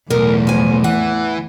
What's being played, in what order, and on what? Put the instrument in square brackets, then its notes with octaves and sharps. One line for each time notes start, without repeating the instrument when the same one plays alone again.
[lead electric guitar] B1 [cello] E2 A2 [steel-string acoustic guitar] A#4
[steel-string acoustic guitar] F3 G#5
[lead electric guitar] E3 [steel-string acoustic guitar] F#5